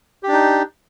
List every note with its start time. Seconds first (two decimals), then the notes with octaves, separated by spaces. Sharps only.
0.23 G4
0.28 D4
0.33 D#4